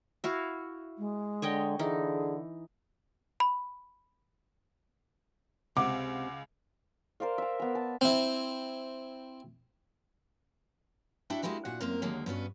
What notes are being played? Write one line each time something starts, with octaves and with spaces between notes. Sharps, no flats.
E4 F#4 F5
G#3
D3 C#5 D#5 G5
D3 E3 D#4 G#4
B5
C#2 C3 F#5 D6
A#4 C5 D5 F5
E5 A#5
B3 A#5
A5
C4 E4
D4 E4 F#4 E5 G5
G#3 A#3 C#4 E4 F#4 G4
A#2 F#4 F#5
F#2 A#3 C4 A#4
D#2 D3 F#3 G#3 A#3
G2 B3 C#4 F#4